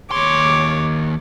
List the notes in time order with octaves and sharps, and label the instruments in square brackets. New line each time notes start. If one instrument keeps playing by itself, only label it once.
[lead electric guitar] D#2 C6 [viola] C#5 D6